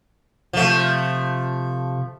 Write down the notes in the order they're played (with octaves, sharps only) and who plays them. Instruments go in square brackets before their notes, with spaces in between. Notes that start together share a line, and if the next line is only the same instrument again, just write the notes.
[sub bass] C3 [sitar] F3 A3